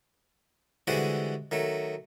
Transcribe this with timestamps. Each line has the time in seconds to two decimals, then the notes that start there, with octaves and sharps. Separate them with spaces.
0.87 D3 E3 G3 G#3 F#4 C5
1.51 D#3 F#3 A3